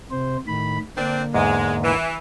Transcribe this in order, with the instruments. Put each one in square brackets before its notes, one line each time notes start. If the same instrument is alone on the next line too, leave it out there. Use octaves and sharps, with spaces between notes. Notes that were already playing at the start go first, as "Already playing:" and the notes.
[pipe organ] C3 C5
A2 D#3 B5
[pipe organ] D3 A#3 [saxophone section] C4 D4
[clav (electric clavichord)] E2 G#2 [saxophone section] G#3
[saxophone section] E3